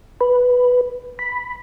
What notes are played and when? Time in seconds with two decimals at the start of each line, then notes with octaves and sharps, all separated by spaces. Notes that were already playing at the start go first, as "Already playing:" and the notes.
0.21 B4
1.19 B5